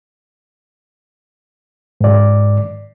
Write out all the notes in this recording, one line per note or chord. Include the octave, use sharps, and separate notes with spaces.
G#2 D5